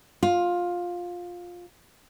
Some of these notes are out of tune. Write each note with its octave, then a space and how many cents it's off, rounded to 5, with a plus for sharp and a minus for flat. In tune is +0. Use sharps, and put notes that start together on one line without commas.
F4 +15